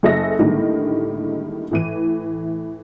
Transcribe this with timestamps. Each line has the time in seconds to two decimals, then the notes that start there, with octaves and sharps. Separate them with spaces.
0.03 F#1 G#4 A4 D#5 E5 A#6
0.39 A2 D3 D#3 G3 G#3 A#3
1.71 A2 E3 D#7